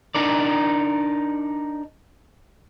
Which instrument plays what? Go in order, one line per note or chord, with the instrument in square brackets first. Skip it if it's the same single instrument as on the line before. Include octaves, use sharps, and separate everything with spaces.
[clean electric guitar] D4 D#4 A#4 D5